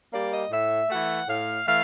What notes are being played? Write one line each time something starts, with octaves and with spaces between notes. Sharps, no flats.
G3 A#3 D5
D#5
A2 E5
E3 A3 F#5
A2 F5
E3 A3 F5